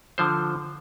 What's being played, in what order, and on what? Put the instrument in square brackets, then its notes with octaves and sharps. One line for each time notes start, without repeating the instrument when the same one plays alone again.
[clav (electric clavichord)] D3 F3 C5